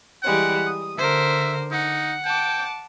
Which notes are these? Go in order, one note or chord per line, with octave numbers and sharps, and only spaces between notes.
E3 G3 G#3 F#5
D#6
D3 A#4 C5 E5
D#4 F#5
G5 A5 D6